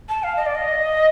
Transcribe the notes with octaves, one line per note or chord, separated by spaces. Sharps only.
A5
F5
D#5
D5
D#5